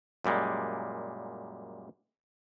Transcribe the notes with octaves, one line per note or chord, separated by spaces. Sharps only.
F#2 A#2 G3 G#3